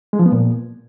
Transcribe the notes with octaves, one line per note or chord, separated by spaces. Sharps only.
G#3
F3
B3
A#2